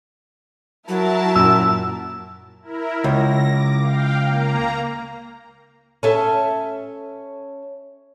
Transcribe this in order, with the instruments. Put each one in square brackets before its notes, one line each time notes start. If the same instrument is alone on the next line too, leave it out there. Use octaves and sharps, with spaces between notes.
[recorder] F#3 [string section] E4 A#4 A5
[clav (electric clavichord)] F#2 A#2 [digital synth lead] E6
[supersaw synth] E4 A#4
[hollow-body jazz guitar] C#2 [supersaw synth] A#6
[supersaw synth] D6
F5 G5
A#3 A#5
[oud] C#4 A4 E5